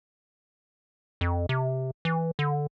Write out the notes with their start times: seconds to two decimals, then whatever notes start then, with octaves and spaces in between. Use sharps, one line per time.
1.21 F2
1.49 C3
2.05 E3
2.39 D3